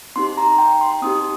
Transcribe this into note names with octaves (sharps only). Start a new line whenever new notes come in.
C4 D#4 G4 C6
A#5
G5
C6
C4 D#4 G4 D#6